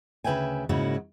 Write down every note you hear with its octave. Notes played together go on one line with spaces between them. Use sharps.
D2 C#3 B4 E5 G5 G#5
G#2 C#3 A#3 E4 F#4